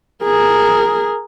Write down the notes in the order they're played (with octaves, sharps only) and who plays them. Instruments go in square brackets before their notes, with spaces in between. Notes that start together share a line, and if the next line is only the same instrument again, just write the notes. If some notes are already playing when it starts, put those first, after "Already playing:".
[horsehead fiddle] G#4 A#4